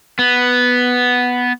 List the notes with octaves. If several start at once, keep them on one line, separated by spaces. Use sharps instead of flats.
B3